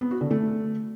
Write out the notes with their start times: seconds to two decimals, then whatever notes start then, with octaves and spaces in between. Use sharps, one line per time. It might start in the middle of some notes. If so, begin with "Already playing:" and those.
0.01 B3
0.11 F#4
0.21 D3
0.31 A3